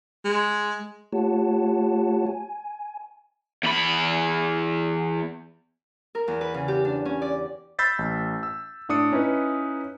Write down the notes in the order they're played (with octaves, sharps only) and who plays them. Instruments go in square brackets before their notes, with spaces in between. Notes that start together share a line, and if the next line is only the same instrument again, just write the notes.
[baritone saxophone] G#3
[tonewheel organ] A3 F4 G4 C#5 F#5 A5
G#5
[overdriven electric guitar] E2 B5
[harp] A#4
E2
B4
C#3
G4
D4
C#4
D5
[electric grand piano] B5 E6 G6 A6 B6 C7
A1
E6
A2 D4 D#6 C#7
C#4 D#4 E4 B4